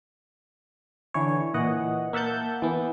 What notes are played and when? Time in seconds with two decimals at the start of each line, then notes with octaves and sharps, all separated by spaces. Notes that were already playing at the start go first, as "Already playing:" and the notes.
1.14 D3 E3 C#5
1.54 A#2 E3 D#5 F#5
2.13 A#3 E5 F#5 A5 G6
2.62 E3 B3